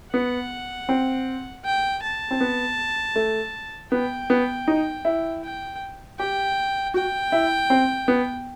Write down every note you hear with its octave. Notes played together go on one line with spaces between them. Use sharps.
B3 F#5
C4
G5
A5
C4
B3
A3
B3 G5
B3
D#4
E4
G5
G4 G5
F#4 G5
E4
C4
B3